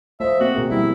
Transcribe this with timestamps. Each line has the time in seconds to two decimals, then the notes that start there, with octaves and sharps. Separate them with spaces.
0.20 F3 A3 D#5 E5
0.40 A#3 C4 F#4 D5
0.56 B2 D#3 G#4
0.70 F3 G3 E4